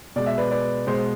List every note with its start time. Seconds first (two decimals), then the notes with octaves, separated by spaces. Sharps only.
0.16 B2 G#3 D5
0.26 E5
0.38 B4 D5
0.51 B4 D5
0.87 B2 G#3 C5